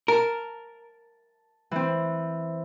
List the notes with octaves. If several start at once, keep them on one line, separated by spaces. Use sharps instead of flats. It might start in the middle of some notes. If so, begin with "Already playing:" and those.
A#4 A5
E3 C4